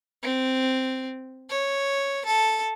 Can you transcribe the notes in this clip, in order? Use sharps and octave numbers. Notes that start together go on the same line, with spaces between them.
C4
C#5
A4